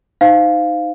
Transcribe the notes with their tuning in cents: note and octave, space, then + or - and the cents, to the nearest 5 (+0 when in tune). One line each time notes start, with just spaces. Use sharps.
D#4 +0 C5 -20 F5 +0